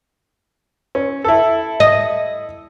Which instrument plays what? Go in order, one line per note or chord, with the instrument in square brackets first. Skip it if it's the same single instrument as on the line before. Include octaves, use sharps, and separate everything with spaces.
[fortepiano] C#4
E4 A4
[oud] D#5